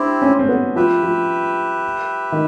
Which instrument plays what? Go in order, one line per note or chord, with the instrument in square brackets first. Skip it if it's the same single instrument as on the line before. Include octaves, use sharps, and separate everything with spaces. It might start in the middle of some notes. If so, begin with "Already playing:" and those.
Already playing: [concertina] C4 E4 G4 [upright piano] D4
[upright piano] C#4
C4
B3
[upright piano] F3 [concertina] G4 B4 E5
[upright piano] F3
D#3